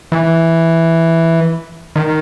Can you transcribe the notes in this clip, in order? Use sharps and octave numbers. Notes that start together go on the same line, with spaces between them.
E3
D#3